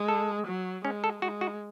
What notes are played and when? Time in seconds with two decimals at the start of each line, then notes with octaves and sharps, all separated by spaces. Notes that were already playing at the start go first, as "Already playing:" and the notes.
Already playing: G#3
0.08 A4
0.47 F#3
0.84 G#3 C#4
1.04 A4
1.22 G#3 F#4
1.41 F#4